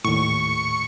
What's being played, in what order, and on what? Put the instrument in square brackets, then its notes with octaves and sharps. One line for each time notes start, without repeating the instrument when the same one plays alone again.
[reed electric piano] D#2 A2 [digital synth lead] C#6